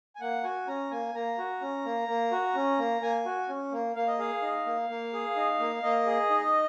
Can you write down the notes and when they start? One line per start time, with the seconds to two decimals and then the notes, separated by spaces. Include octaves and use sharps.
0.16 G#5
0.20 A#3 F#5
0.44 F#4 G#5
0.67 C#4 A#5
0.91 A#3 G#5
1.15 A#3 A#5
1.38 F#4
1.61 C#4
1.85 A#3
2.08 A#3
2.31 F#4
2.55 C#4
2.79 A#3
3.01 A#3 G#5
3.25 F#4
3.49 C#4
3.72 A#3
3.96 A#3 F5
4.07 D#5
4.19 G#4 F5
4.42 D#4
4.66 A#3
4.90 A#3
5.13 G#4
5.36 D#4
5.60 A#3
5.83 A#3 D#5
6.06 G#4
6.30 D#4